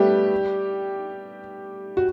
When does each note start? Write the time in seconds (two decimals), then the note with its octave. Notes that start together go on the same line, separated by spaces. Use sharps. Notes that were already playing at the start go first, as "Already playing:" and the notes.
Already playing: G3 A3 B3 G4 B4
1.97 F#4